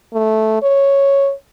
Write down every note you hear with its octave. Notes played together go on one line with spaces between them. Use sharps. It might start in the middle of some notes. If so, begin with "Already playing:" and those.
A3
C#5